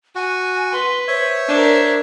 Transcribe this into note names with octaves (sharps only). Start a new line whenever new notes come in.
F#4 G#5
B4 C6
C5 C#5 E5
D4 A#4